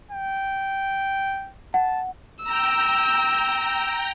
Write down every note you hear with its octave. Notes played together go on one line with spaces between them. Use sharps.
G5
F#5 A5
G5 A#5 E6